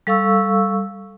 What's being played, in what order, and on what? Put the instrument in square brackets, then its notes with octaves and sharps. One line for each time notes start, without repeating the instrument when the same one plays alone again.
[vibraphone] G3 A4 F5 C#6 E6